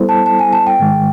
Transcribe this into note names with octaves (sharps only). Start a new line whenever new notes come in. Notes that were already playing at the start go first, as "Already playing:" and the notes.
Already playing: G3 B3 E4 A4 C5
A5
A5
G#5
A5
G5
G#2 D#3 G#3